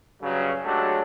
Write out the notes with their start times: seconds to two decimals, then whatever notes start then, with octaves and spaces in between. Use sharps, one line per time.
0.21 G2 C#3 F#3
0.65 F#3 G#3 A3 D4 F#4 G4